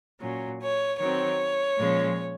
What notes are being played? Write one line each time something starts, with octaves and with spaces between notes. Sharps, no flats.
A#2 F#3 C#4
C#5
D#3 F#3 C4 C#5
A#2 F3 G#3 C#4